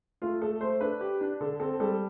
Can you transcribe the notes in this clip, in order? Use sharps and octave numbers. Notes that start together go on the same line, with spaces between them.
A3 F4
A3 A4
A3 C5
D4 B4
G4
D4
D3 A4
C4 A4
G3 A4